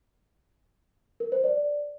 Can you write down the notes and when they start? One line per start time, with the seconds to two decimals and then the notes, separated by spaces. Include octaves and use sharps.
1.20 A#4
1.32 C5
1.44 D5